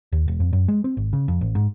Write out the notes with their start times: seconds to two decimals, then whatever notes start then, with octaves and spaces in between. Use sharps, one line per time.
0.12 D#2
0.28 E1
0.40 F2
0.53 F#2
0.68 G#3
0.84 C4
0.97 G#1
1.13 C#3
1.28 F2
1.41 A1
1.55 G#2